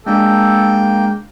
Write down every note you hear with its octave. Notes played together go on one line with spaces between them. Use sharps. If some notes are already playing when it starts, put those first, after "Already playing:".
G#3 A#3 D4 G#4 A4 G5